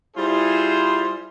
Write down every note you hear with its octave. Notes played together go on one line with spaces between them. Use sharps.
G3 E4 F4 G#4 C5